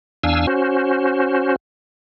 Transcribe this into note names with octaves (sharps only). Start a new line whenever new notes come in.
E2 D4 F5 G#5 E6
C#4 F#4 C5